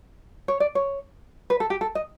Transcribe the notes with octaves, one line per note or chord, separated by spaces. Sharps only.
C#5
D5
C#5
B4
A4
G4
A4
D#5